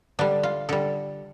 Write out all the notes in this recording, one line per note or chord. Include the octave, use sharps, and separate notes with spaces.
D3 G3 D4
F4
D3 G3 A4